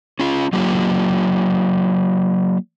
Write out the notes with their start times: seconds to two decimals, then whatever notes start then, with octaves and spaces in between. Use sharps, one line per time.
0.19 C#4 F4
0.53 F#3 A#3 F4 G4